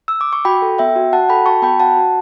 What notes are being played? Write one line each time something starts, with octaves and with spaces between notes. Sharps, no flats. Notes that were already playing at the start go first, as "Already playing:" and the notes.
E6
D6
C#6
F#4 G5 B5
A4
B3 E5 G5
F#4
F#4 F#5 A5
A4 G5 B5
F#4 A5 C#6
B3 G5 B5
F#4 F#5 A5
F#4